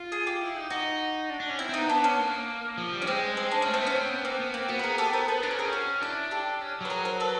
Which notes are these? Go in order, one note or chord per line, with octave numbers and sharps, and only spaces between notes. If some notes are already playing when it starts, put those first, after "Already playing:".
Already playing: F4
G#4
G4
E4
D#4
D#4 F#4
D4
D4
C#4
C4 E4
C4 D#4
B3
D4
C#4
A#3
F3
G3
C#4
G#3 C4
C4
D4
A3 C#4
C4
B3
C#4
C4
B3
A#3 C4
B3
A#3 C4
B3 F#4
B4
G#4 A#4
G4 A4
A#4 C5
A4 B4
D4 A#4
C#4 B4
C4 G#4 A#4
C#4
F#4
D4 E4
G4 A4
C#4
F#3 B4
G#4 A#4
A#4 C5
A4 B4